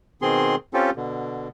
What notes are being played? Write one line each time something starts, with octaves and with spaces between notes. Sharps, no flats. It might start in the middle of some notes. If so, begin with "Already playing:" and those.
B2 D#3 C4 G#4 C6
C4 C#4 F4 G4 A4
B2 D3